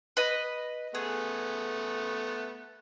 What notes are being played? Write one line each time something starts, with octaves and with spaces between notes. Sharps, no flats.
B4 D#5
A3 B3 G#4